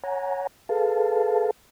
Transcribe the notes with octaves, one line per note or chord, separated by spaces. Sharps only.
C#5 F#5 G#5 A#5
G#4 A4 B4 F5 A5